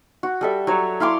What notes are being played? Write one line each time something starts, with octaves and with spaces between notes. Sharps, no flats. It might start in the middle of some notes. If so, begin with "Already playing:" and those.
F#4
G3 A4 E5
F#3 C#5
E4 F5 C6 D6